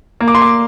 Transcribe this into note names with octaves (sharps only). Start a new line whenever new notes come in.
A#3
D6
C6
D6